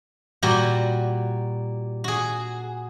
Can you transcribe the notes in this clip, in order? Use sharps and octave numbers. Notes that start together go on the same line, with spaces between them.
A#2 G3 F#4
F#4 G#4